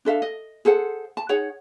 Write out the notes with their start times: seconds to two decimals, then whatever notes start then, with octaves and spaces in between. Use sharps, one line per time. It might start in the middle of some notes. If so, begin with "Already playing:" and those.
0.05 D4 A4 E5 F5
0.22 D#5
0.65 G#4 A4 C5 F#5
1.17 A5
1.29 D#4 G#4 C#5 F#5